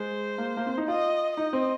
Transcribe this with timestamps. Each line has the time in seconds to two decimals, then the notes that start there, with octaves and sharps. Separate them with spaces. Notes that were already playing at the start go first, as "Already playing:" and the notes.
Already playing: G#3 C5
0.38 A#3
0.57 A#3
0.67 C4
0.78 D#4
0.88 F4 D#5
1.37 D#4 D#5
1.53 C4